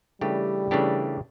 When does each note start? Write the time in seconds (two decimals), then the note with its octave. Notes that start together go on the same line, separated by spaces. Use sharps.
0.21 C#3 E3 G3 A3 D4 G4
0.71 C#3 E3 A3 D4 G4